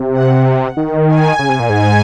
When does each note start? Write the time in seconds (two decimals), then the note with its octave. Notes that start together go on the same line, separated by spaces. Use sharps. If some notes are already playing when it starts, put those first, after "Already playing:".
Already playing: C3
0.14 F#5
0.77 D#3
1.08 G#5
1.39 C#3
1.49 C3
1.60 A#2
1.70 G#2 G#5